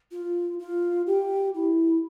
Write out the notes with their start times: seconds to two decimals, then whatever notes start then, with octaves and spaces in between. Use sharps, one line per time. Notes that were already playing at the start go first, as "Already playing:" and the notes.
0.11 F4
0.59 F4
1.06 G4
1.54 E4